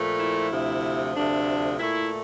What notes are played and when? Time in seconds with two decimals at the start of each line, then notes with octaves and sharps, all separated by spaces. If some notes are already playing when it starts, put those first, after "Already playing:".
Already playing: A#2 F3 A3
0.19 E4
0.51 D2 C3 F3 A3
1.15 D2 C3 F3 A3 D4
1.79 A#2 A3 E4